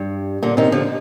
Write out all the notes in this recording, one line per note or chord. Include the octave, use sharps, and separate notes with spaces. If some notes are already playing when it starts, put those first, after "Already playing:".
Already playing: G2
A#2 D3
C3 D#3
D3 F3